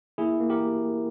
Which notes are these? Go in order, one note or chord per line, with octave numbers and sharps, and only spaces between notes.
A#3 E4 G#4
A#3
G4 A#4